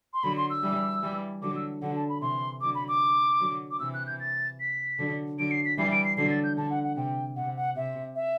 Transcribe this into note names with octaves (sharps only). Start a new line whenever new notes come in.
C6
D3 F#3 B5
C6
E6
E3 G3
E3 G3
D3 F#3 D6
E6
D3 F#3 F#5
A5
B5
C3 E3 C6
D3 F#3 D6
B5
D6
D3 F#3
D6
C3 E3 E6
F#6
G6
A6
B6
D3 F#3
D3 F#3 D7
C7
B6
E3 G3 C7
D7
C7
D3 F#3 C7
A6
G6
D3 A5
F#5
F#5
C3 G5
C3 F#5
F#5
C3 E5
E5